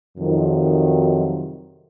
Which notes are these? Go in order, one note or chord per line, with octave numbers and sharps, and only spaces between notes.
F2 C3 D#3 F#3